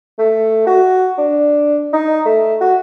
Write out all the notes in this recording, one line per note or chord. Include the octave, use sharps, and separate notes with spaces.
A3
F#4
D4
D#4
A3
F#4